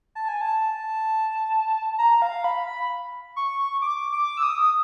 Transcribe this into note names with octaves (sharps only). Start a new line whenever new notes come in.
A5
G#5
A5
A#5
F5
B5
B5
C#6
D6
D6
E6
D#6